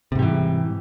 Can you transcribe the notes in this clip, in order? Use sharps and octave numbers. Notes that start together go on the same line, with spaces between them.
G#2 C3 E3 G3